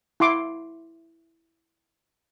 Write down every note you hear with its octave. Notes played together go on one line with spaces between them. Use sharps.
E4 F#5 C6 D6